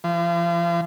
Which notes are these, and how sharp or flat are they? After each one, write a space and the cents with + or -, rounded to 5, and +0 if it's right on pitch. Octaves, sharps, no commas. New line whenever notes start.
F3 -40